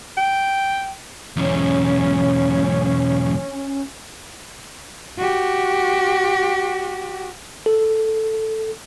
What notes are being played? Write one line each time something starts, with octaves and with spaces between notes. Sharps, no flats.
G5
B1 E2 C#4
F#4 G4
A4